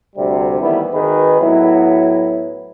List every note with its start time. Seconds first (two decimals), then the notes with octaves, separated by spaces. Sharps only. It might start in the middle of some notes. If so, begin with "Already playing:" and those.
0.16 D2 C3 G3
0.60 D#3 E3 G3 A3 B3 E4
0.93 G#1 D#3 G#4 B4
1.41 A2 F#3 B3 E4